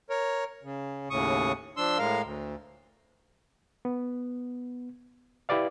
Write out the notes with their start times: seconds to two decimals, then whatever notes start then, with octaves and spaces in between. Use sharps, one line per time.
0.10 A#4 C#5
0.63 C#3
1.10 D#2 A2 C#3 C#6 D#6
1.77 F3 D4 C6 E6
1.98 A2 G#3 A#4 F5
2.23 D2
3.85 B3
5.49 E4 G4 B4 D5 F5